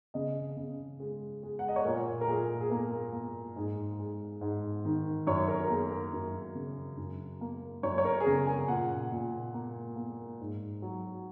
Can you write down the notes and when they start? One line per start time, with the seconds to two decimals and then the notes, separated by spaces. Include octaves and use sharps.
0.14 C#3 D#5
0.57 C#3
1.00 G#3
1.43 G#3
1.59 F#5
1.68 D#5
1.76 C#5
1.85 A#2 A#4
2.21 A#4
2.28 A#2 G#4
2.61 G#4
2.70 A#3 A#4
3.13 A#3
3.56 G#2 G#4
3.99 G#3
4.41 G#2
4.85 D#3
5.26 F#2 C#5
5.48 A#4
5.64 A#4
5.70 A#3 G#4
5.91 A#4
6.13 F#2
6.55 C#3
6.97 F#2
7.41 A#3
7.83 F#2 C#5
7.98 C#5
8.05 A#4
8.20 G#4
8.27 C#3 A#4
8.47 G#5
8.68 A#2 F#5
9.12 A#2
9.54 A#3
9.96 A#3
10.40 G#2
10.82 F#3